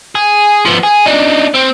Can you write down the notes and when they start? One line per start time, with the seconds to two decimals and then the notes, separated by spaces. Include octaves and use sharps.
0.15 G#4
0.65 F3 B3
0.83 G#4
1.06 D4 D#4
1.54 C4